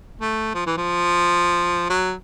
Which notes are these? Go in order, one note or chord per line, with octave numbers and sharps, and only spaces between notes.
A3
F3
E3
F3
F#3